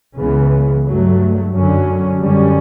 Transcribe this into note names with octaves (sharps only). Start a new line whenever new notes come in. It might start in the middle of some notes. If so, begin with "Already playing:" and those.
C#2 C#3 E3 B3
G2 F#3 A3
F#2 D3 F#3 C#4
F#2 D3 G3 C#4